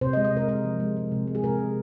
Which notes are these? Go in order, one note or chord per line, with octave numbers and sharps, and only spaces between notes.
C3 C5
D#5
G#3
D#5
C3 A#4
G#3 A#4
F3
G#3
G#3
C3
G#3
G#4
C3 A#4
G#3